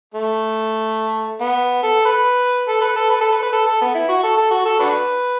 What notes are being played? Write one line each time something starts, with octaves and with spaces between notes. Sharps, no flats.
A3
B3
A4
B4
A4
B4
A4
B4
A4
B4
B4
A4
A4
B3
E4
F#4
A4
A4
F#4
A4
D4 F#4 B4